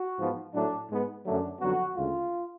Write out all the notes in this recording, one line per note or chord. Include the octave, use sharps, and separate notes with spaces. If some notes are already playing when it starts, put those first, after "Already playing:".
Already playing: F#4
G#2 F3 B3
A2 F#3 A3 D4
G#2 G#3 B3
F#2 D3 F#3 A3 D4
F2 D3 F#3 B3 F#4
D2 C#3 G#3 F4